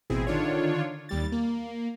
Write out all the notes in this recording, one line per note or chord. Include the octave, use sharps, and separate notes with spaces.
A1 B2 C4 E4 G#4
D3 D#3 D4 F4 C#5
D#2 G3 A6
A#3